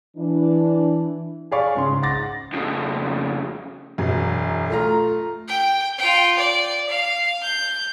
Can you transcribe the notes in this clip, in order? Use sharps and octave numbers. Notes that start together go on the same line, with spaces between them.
E3 D4
G#4 C#5 D5 F5 B5 C#6
G#2 C#3 C6
F#5 C6 D6 A6 A#6
F2 C#3
E1 F#2
A3 F4 A#5
G5
F4 G5
D5
F5
G6